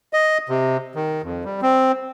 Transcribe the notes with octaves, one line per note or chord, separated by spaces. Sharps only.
D#5
C3
D#3
F2
G3
C4